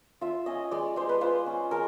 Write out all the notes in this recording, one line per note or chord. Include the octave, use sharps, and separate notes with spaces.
F4 E5
C#4 D#5
G#3 D5
G#3 C5
B4
F4 C5
C#4
G#3 A#4